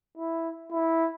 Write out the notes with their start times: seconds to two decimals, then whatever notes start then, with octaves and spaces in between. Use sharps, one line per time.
0.18 E4
0.72 E4